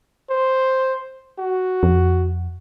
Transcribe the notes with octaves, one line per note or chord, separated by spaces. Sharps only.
C5
F#4
F2